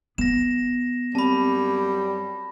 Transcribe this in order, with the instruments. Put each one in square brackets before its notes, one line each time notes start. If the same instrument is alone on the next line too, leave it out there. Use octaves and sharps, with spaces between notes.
[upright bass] B3 [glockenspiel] A#6 E7
[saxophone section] F#2 G3 [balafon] C4 [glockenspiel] A5 B5